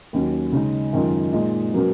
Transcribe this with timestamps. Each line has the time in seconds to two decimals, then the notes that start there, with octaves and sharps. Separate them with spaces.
0.13 D#2 D#3 F#3 C#4
0.52 C#3 G#3 D#4
0.93 F#2 D#3 G#3 C#4 F4
1.33 A#2 G#3 D#4
1.72 B2 F#3 A#3 C#4